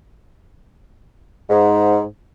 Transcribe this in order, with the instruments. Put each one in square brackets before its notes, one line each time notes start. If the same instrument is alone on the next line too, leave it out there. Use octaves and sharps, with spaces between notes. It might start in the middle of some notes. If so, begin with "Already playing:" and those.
[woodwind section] G#2